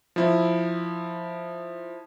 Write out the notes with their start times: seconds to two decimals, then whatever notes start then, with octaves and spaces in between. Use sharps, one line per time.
0.16 F3 E4